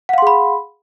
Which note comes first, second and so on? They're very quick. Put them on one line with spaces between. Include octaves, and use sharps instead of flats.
F#5 F5 C6 G#4 B5